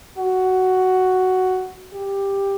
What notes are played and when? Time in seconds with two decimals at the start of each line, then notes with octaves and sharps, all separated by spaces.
0.18 F#4
1.94 G4